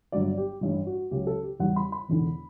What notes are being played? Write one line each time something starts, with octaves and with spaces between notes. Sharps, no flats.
G1 G2 F#3 D5
G4
A1 G2 E3 G3
F#4
C#2 C#3 F#3 G4
A4
G4
E2 C#3 G3 F#5
B5
B5
E1 E2 D3